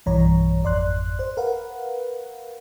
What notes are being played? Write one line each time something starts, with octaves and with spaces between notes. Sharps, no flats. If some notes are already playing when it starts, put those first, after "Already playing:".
B1 G2 E3 C#5 A#5
G#1 F2 D5 C6 F#6
C5
A#4 B4 F5 F#5